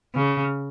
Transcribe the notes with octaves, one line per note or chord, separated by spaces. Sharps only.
C#3